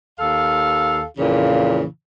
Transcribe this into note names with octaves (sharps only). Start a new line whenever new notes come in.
D#2 A4 F5
F2 A#2 C#3 E3